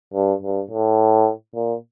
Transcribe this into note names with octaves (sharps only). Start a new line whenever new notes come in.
G2
G2
A2
A#2